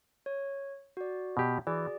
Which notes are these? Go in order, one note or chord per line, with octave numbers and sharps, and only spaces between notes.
C#5
F#4 D5
B2 G4
E3 F#4 G#4 D5